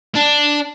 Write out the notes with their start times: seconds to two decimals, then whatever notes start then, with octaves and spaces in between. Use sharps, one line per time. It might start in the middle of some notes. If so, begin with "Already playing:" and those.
0.16 D4